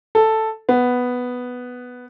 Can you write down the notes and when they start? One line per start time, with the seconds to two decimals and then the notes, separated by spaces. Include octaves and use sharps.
0.15 A4
0.69 B3